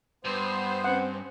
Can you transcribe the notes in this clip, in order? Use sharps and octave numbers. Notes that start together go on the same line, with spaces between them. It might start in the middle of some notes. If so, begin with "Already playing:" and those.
G2 B3 C5
C4 C#4 F#5